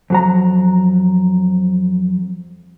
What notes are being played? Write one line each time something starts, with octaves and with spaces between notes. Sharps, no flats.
F2 F#3 A#5